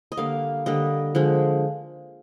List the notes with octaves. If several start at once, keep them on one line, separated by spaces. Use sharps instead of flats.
D#5
D3 G3 A#3 F5
D3 G3 A#3 D#5
D3 F3 G#3